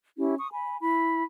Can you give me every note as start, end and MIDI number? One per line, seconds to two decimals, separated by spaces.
0.18 0.35 61
0.18 0.35 64
0.18 0.35 67
0.38 0.48 85
0.38 0.48 87
0.52 0.78 80
0.52 0.78 83
0.81 1.23 64
0.81 1.23 83